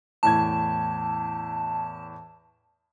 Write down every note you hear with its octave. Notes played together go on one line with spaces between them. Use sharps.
E2 A2 A5 G#6